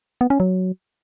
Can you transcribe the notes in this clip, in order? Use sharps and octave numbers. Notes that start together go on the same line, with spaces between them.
B3
C#4
F#3